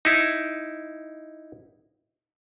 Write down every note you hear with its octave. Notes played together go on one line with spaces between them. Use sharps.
D#4 E4